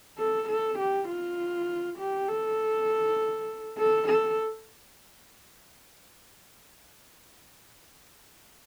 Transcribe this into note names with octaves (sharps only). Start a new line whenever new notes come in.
A4
A4
G4
F4
G4
A4
A4
A4